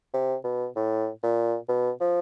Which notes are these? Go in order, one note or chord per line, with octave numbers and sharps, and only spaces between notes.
C3
B2
A2
A#2
B2
F3